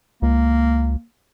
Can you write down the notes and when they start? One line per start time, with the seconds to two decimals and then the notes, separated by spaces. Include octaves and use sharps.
0.22 C#2 A#3